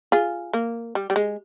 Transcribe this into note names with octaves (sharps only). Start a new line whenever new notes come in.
F4 G#4
A#3
G3
G3
G#3